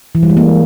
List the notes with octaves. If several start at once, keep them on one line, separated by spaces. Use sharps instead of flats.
E3
G3
G#3
A#3